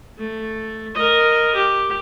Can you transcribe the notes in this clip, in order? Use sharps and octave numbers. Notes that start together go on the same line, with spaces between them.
A3
A#4 D#5
G4